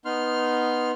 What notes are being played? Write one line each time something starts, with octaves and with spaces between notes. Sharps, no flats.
B3 D#4 C6 F6